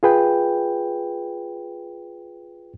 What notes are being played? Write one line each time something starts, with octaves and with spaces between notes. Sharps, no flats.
F4 G#4 B4 G5